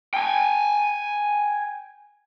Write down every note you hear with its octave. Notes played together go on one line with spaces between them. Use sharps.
G5 G#5